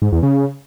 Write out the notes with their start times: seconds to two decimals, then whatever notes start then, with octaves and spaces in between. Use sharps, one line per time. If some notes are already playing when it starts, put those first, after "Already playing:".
0.02 G#2
0.12 E2
0.23 C#3